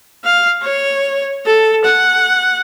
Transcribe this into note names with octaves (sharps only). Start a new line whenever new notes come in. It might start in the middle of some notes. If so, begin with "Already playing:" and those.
F5
C#5
A4
F#5